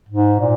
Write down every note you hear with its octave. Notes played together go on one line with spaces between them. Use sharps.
G#2
A#2